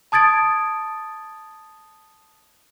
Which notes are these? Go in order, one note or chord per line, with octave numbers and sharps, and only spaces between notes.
A5 D#6 G#6 A6 D7